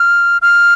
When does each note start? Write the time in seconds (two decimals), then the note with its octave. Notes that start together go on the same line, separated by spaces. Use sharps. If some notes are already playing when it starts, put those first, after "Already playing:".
Already playing: F6
0.42 F6